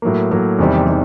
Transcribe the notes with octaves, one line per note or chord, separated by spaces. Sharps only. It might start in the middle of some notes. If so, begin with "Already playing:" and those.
A2 F#3 A#3
A2 F#3 A#3
E2 C3 D#3 G3
D#3 G3